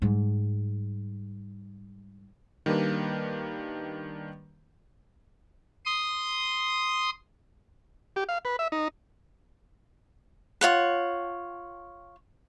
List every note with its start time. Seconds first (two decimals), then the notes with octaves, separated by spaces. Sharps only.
0.02 G#2 G3
2.66 D#3 G3 A#3 D4 B4
5.86 C6 D#6
8.16 G4
8.29 F5
8.45 B4
8.59 E5
8.72 D#4
10.61 F4 C#5 F#5